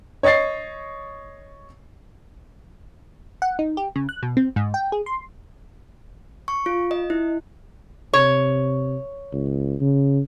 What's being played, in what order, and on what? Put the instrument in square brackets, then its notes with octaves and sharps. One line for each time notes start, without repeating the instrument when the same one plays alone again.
[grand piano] C#5 D#5 C#6 A6 C7
[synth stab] F#5
D#4
G4
C#3
F#6
B2
C4
G#2
G5
G#4
C6
[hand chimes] C#6
F4
D#5
E4
[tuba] C3 [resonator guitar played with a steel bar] C#5
[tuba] C#2
C#3